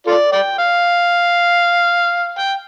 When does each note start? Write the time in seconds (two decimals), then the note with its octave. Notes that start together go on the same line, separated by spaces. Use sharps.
0.07 F4 A4 D5
0.32 D5 G5
0.58 F5
2.38 G5